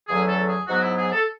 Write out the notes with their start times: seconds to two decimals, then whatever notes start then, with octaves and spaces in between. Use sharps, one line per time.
0.08 E2 D3 F#3 A3 C#4 G#4
0.29 A4
0.49 G#4
0.68 G#2 F#3 B3 F#4
0.83 E4
0.97 G#4
1.13 A4